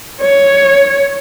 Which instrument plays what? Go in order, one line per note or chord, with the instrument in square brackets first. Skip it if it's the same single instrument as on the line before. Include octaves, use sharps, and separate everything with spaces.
[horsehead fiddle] C#5